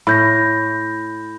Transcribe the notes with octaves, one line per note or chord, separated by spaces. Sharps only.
A2 B5 G6 A#6